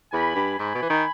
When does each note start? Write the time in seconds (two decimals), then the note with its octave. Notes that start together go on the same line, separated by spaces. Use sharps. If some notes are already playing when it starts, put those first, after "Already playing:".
0.12 E2 G#5 B5
0.35 G2
0.59 G#2 G#5 B5
0.75 B2
0.82 E3
0.90 D#3